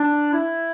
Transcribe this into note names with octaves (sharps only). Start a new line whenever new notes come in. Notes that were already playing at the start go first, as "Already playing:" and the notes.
Already playing: D4
E4